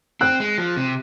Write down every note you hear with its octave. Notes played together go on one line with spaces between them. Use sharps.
C4 F#6
G#3
F3
C3